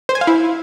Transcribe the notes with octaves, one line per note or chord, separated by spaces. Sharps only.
C5
G#5
F5
E4